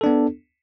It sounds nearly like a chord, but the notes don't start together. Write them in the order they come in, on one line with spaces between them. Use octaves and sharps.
A4 D4 B3